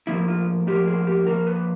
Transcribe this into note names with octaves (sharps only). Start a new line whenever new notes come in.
A2 F3 A#3 E4
F4
A2 F3 A#3 G4
G#4
G4
A2 F3 A#3 A#4
B4